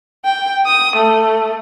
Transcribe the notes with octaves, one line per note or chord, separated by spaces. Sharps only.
G5
D#6
A3